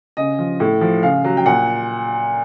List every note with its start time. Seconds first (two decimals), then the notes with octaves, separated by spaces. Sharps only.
0.17 C#3 D#5
0.39 F3
0.60 A2
0.81 F3
1.02 C#3 F5
1.25 F#3
1.37 G5
1.46 A#2 F#5